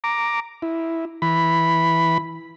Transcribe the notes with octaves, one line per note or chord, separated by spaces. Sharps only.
A#5 D6
E4
E3 B5